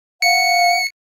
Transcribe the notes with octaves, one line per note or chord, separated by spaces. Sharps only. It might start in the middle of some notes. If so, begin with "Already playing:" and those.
F5 F#5 C#7